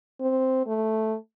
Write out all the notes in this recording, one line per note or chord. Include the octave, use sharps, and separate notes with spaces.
C4
A3